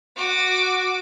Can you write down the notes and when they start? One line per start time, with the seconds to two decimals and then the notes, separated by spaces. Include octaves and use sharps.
0.16 F#4 D6